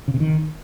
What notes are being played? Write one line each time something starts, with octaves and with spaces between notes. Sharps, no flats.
C#3
C3
D#3